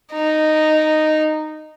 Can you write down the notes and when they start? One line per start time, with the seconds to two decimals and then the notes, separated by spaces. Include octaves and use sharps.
0.13 D#4